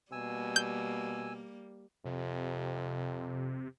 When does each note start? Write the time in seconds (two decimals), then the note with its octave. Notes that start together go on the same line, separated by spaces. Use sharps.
0.12 B2 G3 A#3 G#5 E6
0.56 G6
2.05 F2 C3